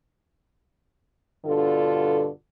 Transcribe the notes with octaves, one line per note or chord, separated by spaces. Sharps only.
G2 B2 D3 F4 A4